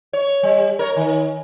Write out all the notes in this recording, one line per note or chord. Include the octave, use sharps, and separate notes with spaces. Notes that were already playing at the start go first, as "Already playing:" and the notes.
C#5
G3
A#4 C#5
D#3